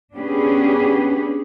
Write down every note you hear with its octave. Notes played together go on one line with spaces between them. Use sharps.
B3 C#4 D4 G4 G#4 B4